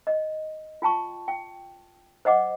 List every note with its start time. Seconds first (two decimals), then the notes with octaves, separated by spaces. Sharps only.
0.07 D#5
0.82 F4 G5 A5 C#6
1.28 G5
2.25 C5 D#5 F#5 D6